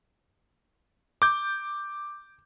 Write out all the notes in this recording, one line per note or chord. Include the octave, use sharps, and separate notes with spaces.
D6 G6